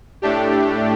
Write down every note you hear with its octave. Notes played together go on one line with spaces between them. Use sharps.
A2 A3 D4 G4